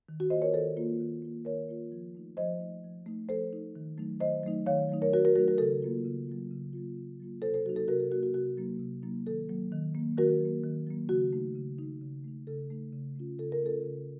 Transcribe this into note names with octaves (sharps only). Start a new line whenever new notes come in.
D#3
F#4
A#3 F4 C5 D#5
A#4 C#5
D#3 A4 C5
A#3 F4
D#3
A#3 F4
D#3 A#4 C#5
A#3 F4
F3
A3 D#4
F3 C5 D#5
A3 D#4
F3
A3 D#4
F3 A4 C5
A3 D#4
D#3
F#3 A3 D#4
D#3 C5 D#5
F#3 A3 D#4
D#3 C#5 F5
F#3 A3 D#4
A#4 C#5
D#3 F#4 A#4
F#4 A#4
F#3 A3 D#4 F#4 A#4
F#4 A#4
C#3 A4
F#3 A#3 F4
C#3
F#3 A#3 F4
C#3
F#3 A#3 F4
C#3
F#3 A#3 F4
C3 A4 C5
A4 C5
F#3 A#3 D#4 F#4
A4
C3 F#4 A#4
A4
F#3 A#3 D#4 F#4
F#4
C3 F#4
F#3 A#3 D#4
C3
F#3 A#3 D#4
D#3 A4
F#3 A#3
D#3
F#3 A#3
D#3 F#4 A#4
F#3 A#3
D#3
F#3 A#3
C#3 F#4
A3 D#4
C#3
A3 D#4
C#3
A3 D#4
C#3 A4
A3 D#4
C#3
A3 C#4 F4
C#3 A4
A#4
A3 C#4 F4 A4
C#3